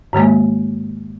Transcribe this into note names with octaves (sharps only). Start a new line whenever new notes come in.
G#2 D#3 G#3 A#3